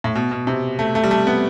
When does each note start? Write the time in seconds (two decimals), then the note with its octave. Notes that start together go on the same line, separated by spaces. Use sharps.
0.04 A2
0.15 B2
0.31 B2
0.47 C3
0.79 A3
0.95 A3
1.03 G3
1.11 A3
1.27 B3